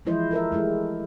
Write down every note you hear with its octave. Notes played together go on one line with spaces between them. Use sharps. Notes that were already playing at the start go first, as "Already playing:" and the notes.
E3 F3 G#3 E4 C5 D#5
A4 A#4 C5 E5
G#3 A3 E4 G4